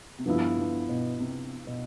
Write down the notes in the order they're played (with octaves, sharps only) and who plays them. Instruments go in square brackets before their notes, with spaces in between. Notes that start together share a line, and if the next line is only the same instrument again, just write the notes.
[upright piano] C3
[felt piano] G2 F3 B3 E4 [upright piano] D3
[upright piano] D3
B2
C3
B2